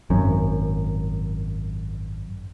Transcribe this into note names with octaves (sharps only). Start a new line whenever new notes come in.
G#1 F#2